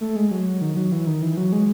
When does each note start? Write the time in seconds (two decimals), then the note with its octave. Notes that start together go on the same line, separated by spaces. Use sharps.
0.01 A3
0.16 G#3
0.31 F#3
0.61 D#3
0.77 F#3
0.92 E3
1.07 D#3
1.22 E3
1.32 E3
1.37 F#3
1.52 G#3